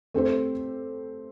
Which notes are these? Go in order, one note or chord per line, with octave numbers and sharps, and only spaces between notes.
A3 C4 G4 C5